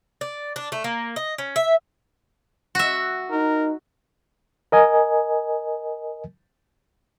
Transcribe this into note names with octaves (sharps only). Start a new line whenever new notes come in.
D5
D4
A3
A#3
D#5
C#4
E5
F#4 E5
D#4 A#4
A#4 D#5 G#5